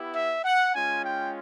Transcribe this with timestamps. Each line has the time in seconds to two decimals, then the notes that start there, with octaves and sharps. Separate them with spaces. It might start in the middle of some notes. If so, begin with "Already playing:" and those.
Already playing: B3 E4 G4
0.14 E5
0.44 F#5
0.74 G#3 C#4 F4 G#5
1.05 G5